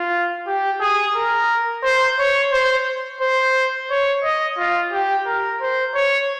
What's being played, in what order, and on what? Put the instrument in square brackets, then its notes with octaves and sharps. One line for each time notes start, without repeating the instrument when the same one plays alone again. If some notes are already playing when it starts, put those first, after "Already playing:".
Already playing: [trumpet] F4
G4
G#4
A#4
C5
C#5
C5
C5
C#5
D#5
F4
G4
A#4
C5
C#5